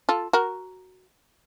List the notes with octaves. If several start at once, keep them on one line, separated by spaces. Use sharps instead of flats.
F4 A4
F#4 A#4